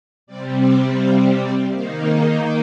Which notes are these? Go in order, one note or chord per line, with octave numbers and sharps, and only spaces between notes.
C3 G3 C4 D5
D5
F5
D5
D#3 A#3 D#4 C5
G#4